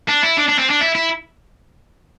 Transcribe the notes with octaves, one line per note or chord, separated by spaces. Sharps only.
D4
E4
D4
D4
C4
D4
E4
E4